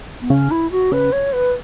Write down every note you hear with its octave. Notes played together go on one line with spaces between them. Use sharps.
B3
C#3 C#4
E4
F#4
C#3 B4
C#5
B4